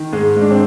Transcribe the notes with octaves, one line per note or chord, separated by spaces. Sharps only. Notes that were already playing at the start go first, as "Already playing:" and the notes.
Already playing: D#3
G#2 G#3
G#2 D4
C4